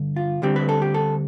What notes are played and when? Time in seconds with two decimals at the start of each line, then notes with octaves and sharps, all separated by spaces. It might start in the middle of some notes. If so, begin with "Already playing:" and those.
Already playing: G2 D3
0.16 F4
0.42 D2 D3 G3 C4 G4
0.56 B4
0.69 A4
0.82 G4
0.94 A4